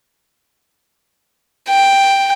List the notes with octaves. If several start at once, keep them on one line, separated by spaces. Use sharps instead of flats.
G5